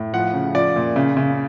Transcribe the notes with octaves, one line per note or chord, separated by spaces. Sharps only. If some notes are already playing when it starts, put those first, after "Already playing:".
Already playing: A2
F3 F#5
C#3
F3 D5
A#2
C#3
C#3